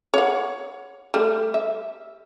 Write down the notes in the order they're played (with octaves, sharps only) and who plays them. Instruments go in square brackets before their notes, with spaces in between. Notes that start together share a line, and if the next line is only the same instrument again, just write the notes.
[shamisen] C#5 F#5
G3 A3
E5